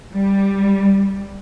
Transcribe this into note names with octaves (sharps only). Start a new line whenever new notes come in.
G3